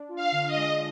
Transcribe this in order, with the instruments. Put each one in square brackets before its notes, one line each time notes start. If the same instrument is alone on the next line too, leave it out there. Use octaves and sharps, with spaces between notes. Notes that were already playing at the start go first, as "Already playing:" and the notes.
Already playing: [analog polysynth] D4
F4
[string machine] F5
[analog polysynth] D3
[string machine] D#5
[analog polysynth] G#3